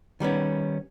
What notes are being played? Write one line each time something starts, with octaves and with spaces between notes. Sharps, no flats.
D#3 G3 B3 C#4